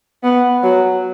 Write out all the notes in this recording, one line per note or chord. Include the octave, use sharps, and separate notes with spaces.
B3
F#3